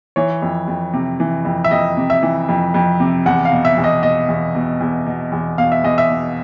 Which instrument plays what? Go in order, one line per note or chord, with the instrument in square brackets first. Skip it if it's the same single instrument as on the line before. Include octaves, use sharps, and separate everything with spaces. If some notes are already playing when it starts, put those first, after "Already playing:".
[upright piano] E3 C#5
F2
F2
C3
E3
F2
E5
F2 D#5
C3
E5
E3
F2
F2
C3
E2 F#5
F5
B2
E5
E2
D#5
B2 D#5
E2
B2
E2
B2
E2
B2 F5
E5
E2 D#5
E5
B2